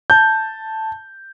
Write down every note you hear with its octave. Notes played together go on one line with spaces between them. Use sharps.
A5 G6